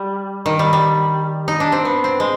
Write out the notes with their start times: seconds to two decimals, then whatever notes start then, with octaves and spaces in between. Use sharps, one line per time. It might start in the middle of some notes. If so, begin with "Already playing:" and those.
Already playing: G3
0.46 D#3
0.59 G3
0.73 G3
1.48 D#4
1.60 D4
1.72 C4
1.85 B3
2.04 C4
2.20 G#3